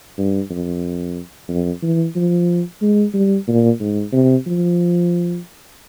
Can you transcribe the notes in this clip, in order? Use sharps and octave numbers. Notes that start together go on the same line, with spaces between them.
G2
F2
F2
E3
F3
G#3
G3
A#2
G#2
C3
F3